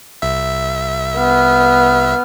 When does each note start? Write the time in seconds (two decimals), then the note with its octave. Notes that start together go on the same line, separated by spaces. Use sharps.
0.22 C2 E5
1.17 B3 F6